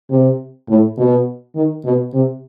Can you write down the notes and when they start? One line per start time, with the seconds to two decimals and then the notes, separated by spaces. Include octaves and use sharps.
0.10 C3
0.68 A2
0.97 B2
1.55 D#3
1.85 B2
2.13 C3